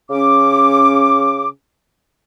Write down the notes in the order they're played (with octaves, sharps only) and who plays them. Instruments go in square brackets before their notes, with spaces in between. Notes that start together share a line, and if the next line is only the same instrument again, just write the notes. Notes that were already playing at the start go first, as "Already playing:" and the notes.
[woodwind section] C#3 C#4 D6